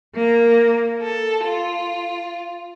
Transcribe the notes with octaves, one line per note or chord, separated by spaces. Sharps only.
A#3
A4
F4